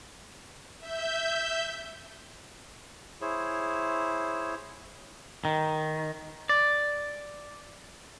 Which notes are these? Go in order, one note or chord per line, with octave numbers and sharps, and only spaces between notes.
E5 G6
E4 G#4 C5 C#5
D#3
D5